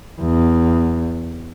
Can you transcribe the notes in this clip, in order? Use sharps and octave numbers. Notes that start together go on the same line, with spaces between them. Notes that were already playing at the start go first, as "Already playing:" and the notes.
E2